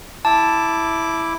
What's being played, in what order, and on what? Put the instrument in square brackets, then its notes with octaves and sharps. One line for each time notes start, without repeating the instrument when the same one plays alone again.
[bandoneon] E4 D6 [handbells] A5